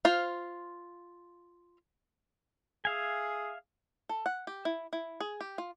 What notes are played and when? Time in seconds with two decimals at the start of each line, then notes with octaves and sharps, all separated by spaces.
0.05 F4 C5 F5
2.85 G#4 E5 F5 G#5
4.09 A4
4.26 F#5
4.47 G4
4.65 E4
4.93 E4
5.20 G#4
5.41 G4
5.58 F4